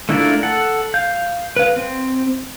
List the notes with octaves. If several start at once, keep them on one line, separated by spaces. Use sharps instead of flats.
A3 D4 E4 F4 A#4
A4 F#5
F5 G6
B4 F5
C4